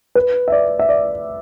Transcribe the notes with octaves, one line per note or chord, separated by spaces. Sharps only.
B4
E5
D5
E5
D5